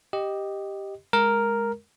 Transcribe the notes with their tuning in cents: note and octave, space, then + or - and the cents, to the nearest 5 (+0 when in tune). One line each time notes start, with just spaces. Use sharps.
G4 +0 D#5 +0
G#3 +0 A#4 +0